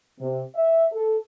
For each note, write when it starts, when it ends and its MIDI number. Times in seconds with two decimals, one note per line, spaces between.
0.20 0.41 48
0.55 0.85 76
0.93 1.15 69